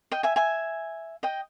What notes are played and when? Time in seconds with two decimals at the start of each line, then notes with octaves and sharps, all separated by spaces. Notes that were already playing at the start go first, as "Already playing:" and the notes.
0.12 D#5 G5
0.23 E5 G#5
0.36 E5 G#5
1.23 D#5 G5